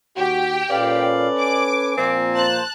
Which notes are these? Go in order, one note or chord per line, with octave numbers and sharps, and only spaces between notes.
D#2 F#4 G4 G5
A#2 C#4 A4 B4 D5 F5
G#5 D6
A#2 F3 A#3 C4
C5 A5 F#6